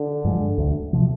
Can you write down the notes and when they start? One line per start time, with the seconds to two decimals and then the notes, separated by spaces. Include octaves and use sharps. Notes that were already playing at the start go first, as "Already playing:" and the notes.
Already playing: D3
0.24 G2 F3 G#3
0.58 D2
0.93 C3 F3